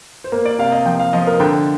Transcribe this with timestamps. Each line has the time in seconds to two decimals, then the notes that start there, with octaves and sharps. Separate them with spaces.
0.24 C5
0.32 A#3 A#4
0.46 D5
0.59 C3 F5
0.72 D#5
0.86 F3 G5
0.99 F5
1.13 F3 D#5
1.27 A#4
1.40 D3 G5